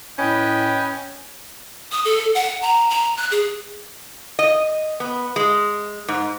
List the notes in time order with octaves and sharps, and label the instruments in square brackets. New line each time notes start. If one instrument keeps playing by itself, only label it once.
[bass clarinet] A2 [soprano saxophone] C#4 [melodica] B4 D#5 [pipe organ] G5
[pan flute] D#6
A4
F#5
A#5
A#5
F#6
G#4
[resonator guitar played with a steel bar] D#5
B3
G#3
G#2